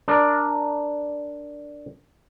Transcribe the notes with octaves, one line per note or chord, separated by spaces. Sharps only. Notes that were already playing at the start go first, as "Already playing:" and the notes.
D4 A#4 D5